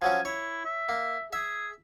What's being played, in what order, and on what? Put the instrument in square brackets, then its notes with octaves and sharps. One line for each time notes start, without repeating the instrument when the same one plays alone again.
[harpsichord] F3 F#3 C#4 [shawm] G#5
[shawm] E4 [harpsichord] C#5
[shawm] E5
[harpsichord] A#3
[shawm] G#4 [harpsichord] E5